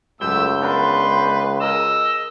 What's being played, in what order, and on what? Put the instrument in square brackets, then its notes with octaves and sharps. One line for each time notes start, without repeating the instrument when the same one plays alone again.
[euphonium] C#2 [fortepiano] F#2 [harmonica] A3 E6 [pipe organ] G6
[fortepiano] B3 D4 A#4 [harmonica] B4 C6
[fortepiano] G#4 A#4 [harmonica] D#5 [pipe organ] E6